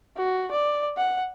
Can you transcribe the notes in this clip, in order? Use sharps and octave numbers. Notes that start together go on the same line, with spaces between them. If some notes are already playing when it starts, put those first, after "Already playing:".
F#4
D5
F#5